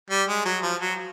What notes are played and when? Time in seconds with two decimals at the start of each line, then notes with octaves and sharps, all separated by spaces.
0.10 G3
0.28 G#3
0.45 F#3
0.63 F3
0.81 F#3